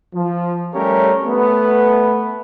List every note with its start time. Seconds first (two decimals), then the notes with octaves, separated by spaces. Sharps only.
0.14 F3
0.75 G3 A3 C#4 G4 A#4 C#5
1.25 A3 B3